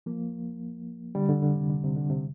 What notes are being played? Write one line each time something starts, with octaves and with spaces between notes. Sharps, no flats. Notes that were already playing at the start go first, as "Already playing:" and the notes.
F3 A#3
D3 G3
D3
D3
C3
D3
C3
D3
C3